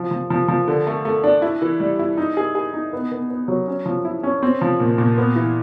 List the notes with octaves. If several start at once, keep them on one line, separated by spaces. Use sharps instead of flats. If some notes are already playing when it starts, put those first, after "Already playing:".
Already playing: F3
F3
F3
F3
D3
A3
A3
D4
E4
E3
G3
E4
D#4
G#4
G#4
D#4
B3
B3
B3
F#3
C#4
F3
E4
C#4
C4
F3
A#2
A#2
B3
E3